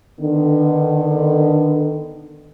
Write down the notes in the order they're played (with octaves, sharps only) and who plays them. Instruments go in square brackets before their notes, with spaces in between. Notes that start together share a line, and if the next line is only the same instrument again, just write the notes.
[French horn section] D3 D#3 B3